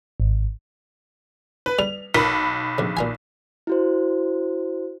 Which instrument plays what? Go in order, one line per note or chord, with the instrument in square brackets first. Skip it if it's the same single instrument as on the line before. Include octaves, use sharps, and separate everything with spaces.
[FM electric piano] G#1
[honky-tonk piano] B4
[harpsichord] G3 [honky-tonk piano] F7
[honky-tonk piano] B1 B5 [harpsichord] A#4
[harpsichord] A#1 C3
A#2 F4 G#5
[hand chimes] E4 F#4 C5